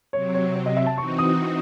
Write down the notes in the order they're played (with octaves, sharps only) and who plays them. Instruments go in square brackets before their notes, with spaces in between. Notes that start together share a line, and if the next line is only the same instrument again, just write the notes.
[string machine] C3 F#3 C4 [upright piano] C#5
[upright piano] C#5
C#5
D#5
E5
A5
[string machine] E3 C4 D#4 F#4 [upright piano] C#6
[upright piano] D#6